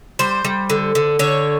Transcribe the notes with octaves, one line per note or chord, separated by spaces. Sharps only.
G3 C5
G3
D3
D3
D3 C#5